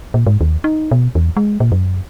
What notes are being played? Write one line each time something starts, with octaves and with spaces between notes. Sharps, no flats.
A#2
G#2
D#2
D#4
B2
E2
G#3
A#2
F#2